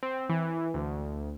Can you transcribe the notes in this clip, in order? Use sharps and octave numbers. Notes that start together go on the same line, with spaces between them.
C4
E3
D2